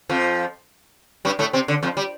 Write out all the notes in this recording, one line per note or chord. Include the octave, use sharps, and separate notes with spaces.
F2 F3
G2 G3
A2 A3
C3 C4
D3
F2 F3
G3